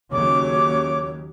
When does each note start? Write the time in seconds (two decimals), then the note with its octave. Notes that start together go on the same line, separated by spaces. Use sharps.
0.12 D#2 C#3 F#3 C#5 D6